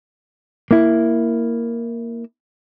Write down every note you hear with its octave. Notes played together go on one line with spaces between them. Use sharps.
A#3 E4